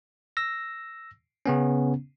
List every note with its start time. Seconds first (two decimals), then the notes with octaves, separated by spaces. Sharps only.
0.37 E6 A#6
1.46 C#3 B3 C#4